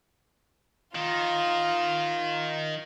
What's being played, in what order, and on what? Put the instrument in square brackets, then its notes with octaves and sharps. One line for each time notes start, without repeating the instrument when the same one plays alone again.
[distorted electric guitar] D#3 [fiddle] F4 A#5